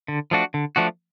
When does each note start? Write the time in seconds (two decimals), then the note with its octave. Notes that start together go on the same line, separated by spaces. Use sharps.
0.08 D3
0.31 F3 A3 D4 F#4
0.54 D3
0.76 F3 A3 D4 F#4